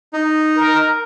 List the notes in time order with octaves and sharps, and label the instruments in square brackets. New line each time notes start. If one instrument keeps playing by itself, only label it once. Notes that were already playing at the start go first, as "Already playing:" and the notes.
[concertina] D#4
[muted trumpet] A#4